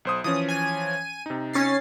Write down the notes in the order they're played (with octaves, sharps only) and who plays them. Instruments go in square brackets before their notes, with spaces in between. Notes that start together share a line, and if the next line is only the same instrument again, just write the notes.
[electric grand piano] B1 C5 D#6
[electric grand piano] E3 F3 C#4 [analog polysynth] D#6
[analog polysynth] G#5 D#7
[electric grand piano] C3 D#4
[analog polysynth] C#4 A6 C7